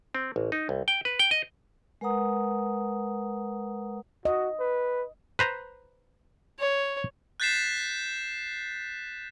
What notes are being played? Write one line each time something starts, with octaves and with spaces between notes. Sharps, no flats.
C4
A1
D#4
C2
G5
B4
G5
D#5
G#3 A#4 B4 F#5 A#5 D#6
F#4 D#5
B4
B4 C5 A#5
C#5
F#6 G6 A6 B6 C7 E7